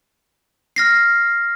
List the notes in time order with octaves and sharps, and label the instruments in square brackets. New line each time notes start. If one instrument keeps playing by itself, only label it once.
[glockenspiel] F6 A#6 C7